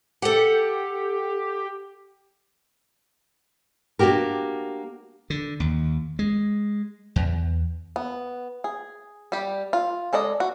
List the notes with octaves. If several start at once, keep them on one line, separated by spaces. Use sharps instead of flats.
G4 A4 F#5
A#3 D4 F#4 G4 A#4
D3
D#2
G#3
E2
B3
G#4
G3 G4
F4
G#3 A4 D5 D#5
F#4